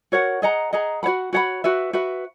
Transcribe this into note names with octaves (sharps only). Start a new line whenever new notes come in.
F#4 A#4 C#5 F#5
G#4 D#5 F#5 A#5
G#4 D#5 F#5 A#5
F#4 C#5 F#5 B5
F#4 C#5 F#5 B5
F#4 B4 E5
F#4 B4 E5